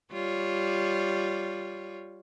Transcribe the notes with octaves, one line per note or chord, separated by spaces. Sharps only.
G3 F4 C#5